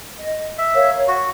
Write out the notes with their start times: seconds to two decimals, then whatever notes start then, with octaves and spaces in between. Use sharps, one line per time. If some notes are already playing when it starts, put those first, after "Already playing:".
0.18 D#5
0.58 E5
0.74 A#4 C#5 F5
1.08 F#4